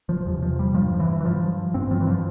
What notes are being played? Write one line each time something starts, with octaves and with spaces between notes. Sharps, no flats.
F3
E2 C3
F3
G3
G2 F3
E3
E3
G2 F3
G2 C4
F3
E3
F3